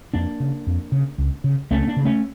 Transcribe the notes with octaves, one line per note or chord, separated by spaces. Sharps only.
F2 A#3 D4
C#3
F2
C#3
C#2
C#3
C#2 A3 C#4
C#4
A#3 D4
C#3
A3 C#4